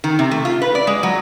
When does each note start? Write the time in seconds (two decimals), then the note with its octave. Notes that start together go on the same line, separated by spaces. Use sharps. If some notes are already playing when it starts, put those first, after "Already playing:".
0.04 D#3
0.19 C3
0.31 A3
0.45 F4
0.62 B4
0.75 D5
0.87 G#3
1.03 F#3